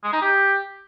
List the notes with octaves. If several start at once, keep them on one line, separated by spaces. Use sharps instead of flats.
G#3
D#4
G4